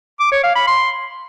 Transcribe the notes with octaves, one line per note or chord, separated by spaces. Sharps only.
D6
C#5
F5
B5
C6